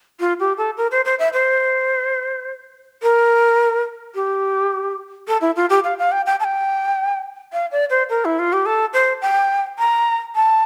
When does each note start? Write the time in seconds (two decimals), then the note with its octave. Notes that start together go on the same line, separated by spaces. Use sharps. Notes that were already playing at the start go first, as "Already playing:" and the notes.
0.20 F4
0.40 G4
0.58 A4
0.77 A#4
0.91 C5
1.05 C5
1.19 E5
1.33 C5
3.02 A#4
4.15 G4
5.28 A4
5.41 E4
5.56 F4
5.70 G4
5.84 F5
5.99 F5
6.12 G5
6.26 G5
6.40 A5
6.44 G5
7.53 F5
7.72 D5
7.90 C5
8.10 A#4
8.25 E4
8.39 F4
8.53 G4
8.66 A4
8.94 C5
9.22 G5
9.79 A#5
10.35 A5